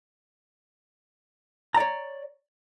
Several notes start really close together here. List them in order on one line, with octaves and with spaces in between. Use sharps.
A#5 D5 C#5